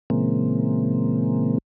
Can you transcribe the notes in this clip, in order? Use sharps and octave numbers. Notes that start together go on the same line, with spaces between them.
A#2 C#3 E3 G#3 A#3 C4